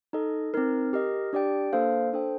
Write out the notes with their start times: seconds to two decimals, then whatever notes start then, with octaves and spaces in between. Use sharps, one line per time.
0.13 D#4 A4 D#5
0.54 C4 D#4 A#4
0.93 G4 A#4 D#5
1.33 D4 G4 D5 G5
1.73 A#3 D4 A4 C5 F5
2.13 D4 A4 C5 G5